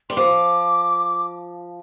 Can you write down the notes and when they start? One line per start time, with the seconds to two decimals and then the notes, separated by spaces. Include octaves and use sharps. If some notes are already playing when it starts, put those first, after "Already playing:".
0.10 G3 C6
0.17 F3 D6